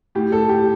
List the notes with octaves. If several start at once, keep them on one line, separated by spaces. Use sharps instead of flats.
A2 G4
A4
G4